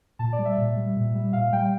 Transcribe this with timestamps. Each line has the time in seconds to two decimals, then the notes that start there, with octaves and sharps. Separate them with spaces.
0.19 A#2 A5
0.33 D5
0.39 G3
0.45 E5
0.57 A#2
0.76 G3
0.96 A#2
1.14 G3
1.33 A#2 F5
1.52 G3 G5